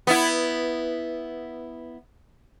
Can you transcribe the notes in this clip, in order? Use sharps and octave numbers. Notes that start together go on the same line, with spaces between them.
B3 E4